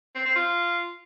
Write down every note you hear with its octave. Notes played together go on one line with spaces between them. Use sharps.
C4
C4
F4